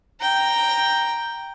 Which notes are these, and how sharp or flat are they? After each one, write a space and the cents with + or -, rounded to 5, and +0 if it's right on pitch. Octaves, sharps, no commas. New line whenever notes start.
G5 +0 A#5 +0